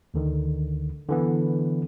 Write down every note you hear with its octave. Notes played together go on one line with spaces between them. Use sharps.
D2 D3 D#3
D3 E3 B3